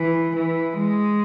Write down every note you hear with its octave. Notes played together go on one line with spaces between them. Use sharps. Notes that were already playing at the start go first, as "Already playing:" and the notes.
Already playing: E3
E3
G#3